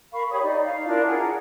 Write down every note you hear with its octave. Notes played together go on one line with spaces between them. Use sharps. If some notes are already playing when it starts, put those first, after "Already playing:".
A#4 F5 B5 C#6
G4 C#5 B5 D#6
D#4 D5
F5
D4 E4 F4 A#4
G#4 A#4 C#5 F#5